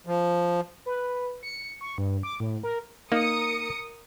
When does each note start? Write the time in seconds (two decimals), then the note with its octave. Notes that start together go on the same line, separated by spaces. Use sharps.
0.07 F3
0.86 B4
1.43 C#7
1.81 C#6
1.98 G2
2.23 D6
2.40 A2
2.63 A#4
3.12 A#3 D#4 A#4 D#6 C#7